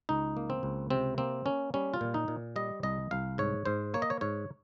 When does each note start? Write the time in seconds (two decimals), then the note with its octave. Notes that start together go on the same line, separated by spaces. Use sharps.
0.09 C#2 D#4
0.37 A#3
0.50 C4
0.63 C#2
0.90 C3 C4
1.18 A#3 C4
1.46 A#3 C#4
1.74 G3 C#4
1.94 F4
2.01 A#2
2.14 D#4
2.28 A#2
2.56 G3 D#5
2.83 C2 D#5
3.11 C2 F5
3.38 G#2 C#5
3.65 G#2 C5
3.94 A#3 C#5
4.02 D#5
4.10 C#5
4.21 G#2 C#5